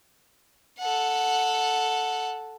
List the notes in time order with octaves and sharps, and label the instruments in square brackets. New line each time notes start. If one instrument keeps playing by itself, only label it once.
[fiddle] A4 F#5